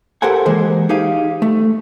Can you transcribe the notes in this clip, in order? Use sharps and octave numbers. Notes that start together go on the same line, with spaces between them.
G4 A4 A#4 C5 F#5 G#5
E3 G#3 A#3 G#4 C5
D#4 G4 G#4 F5
A3